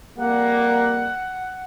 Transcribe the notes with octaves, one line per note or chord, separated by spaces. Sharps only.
F2 G3 A#3 F#5